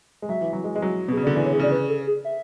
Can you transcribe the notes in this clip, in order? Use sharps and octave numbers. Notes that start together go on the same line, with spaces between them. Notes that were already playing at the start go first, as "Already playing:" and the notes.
G#3
F#3 E5
E3
F#3
G#3
G#3
F#3
B2 G#4
C#3
D5
D3
E3 D5
C#5
G#4
C#3 D5
B4
A4
G#4
E5